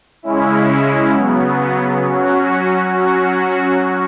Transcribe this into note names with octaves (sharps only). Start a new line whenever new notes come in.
C#3 G#3 C#4 E4
C#3 F#3 B3
F#3 C#4 F#4
F#3 C#4 F#4